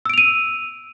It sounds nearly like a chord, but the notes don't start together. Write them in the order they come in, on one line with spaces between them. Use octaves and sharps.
E6 D7 F7 D#7